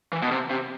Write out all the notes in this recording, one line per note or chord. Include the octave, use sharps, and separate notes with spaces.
E3
B2
C3
C3